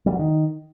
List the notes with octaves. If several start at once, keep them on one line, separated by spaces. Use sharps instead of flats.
G3
F#3
D#3